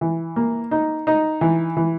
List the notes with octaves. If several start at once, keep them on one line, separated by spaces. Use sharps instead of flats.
E3
A#3
D#4
D#4
E3
E3